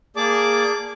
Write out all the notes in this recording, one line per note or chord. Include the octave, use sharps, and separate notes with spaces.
A#3 G#4 D5 A5 D6